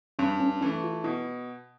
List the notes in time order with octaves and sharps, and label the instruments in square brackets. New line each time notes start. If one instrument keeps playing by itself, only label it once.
[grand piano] G2 [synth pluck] C#4
[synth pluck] C#4
[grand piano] E3 A3 [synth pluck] C#4
[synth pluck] F4
[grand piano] B2 [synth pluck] E4